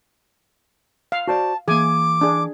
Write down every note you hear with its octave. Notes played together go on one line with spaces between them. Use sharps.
F5
F#4 C5 D5 A5
E3 A#3 G#4 G#5 D6
D4 G#4